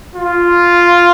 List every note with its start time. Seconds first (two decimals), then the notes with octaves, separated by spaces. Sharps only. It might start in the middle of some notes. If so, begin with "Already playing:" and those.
0.16 F4